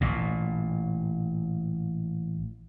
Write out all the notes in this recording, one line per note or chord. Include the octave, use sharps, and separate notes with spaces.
A1 A#2